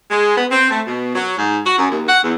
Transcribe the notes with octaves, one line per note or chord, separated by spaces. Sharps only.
G#3
B3
C4
A3
B2
F#3
G#2
F#4
F#2
D#2
F#5
E2